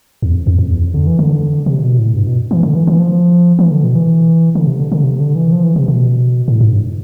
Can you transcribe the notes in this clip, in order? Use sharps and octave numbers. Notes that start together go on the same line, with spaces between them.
E2
F2
F2
F2
E2
F2
D3
E3
D3
C3
B2
A2
G2
B2
E3
D3
E3
E3
F3
E3
D3
B2
E3
D3
C3
D3
D3
C3
D3
E3
F3
E3
C3
B2
A2
G2
A2
G2